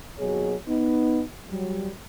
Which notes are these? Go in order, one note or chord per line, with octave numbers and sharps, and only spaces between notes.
D#2 B2 F#3 G#4 C#5
B3 D#4
F#3 G3